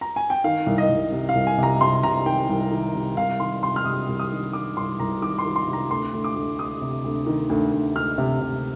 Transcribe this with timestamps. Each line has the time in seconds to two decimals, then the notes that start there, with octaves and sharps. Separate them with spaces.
0.01 A#5
0.16 G#5
0.30 G5
0.44 D#3 F5
0.66 C2
0.78 D#5
0.90 C2
1.12 C3
1.29 F5
1.35 C2
1.47 G#5
1.58 C3 A#5
1.81 C3 C6
2.03 C3 A#5
2.26 D#3 G5
2.49 C2
2.71 D#3
2.94 C3
3.17 C2 F5
3.40 D#3 C6
3.63 C3 C6
3.76 F6
3.85 C3 D#6
4.09 C2
4.19 D#6
4.31 D#3
4.53 D#3 D6
4.77 C2 C6
5.00 C2 A#5
5.22 D#3 D6
5.39 C6
5.45 D#3
5.56 C6
5.67 C3
5.73 A#5
5.90 D2 C6
6.13 D2
6.24 D6
6.36 D2
6.59 D2 D#6
6.81 C3
7.04 D2
7.26 D#3
7.49 D2
7.72 D2
7.96 D2 F6
8.18 C3
8.41 C3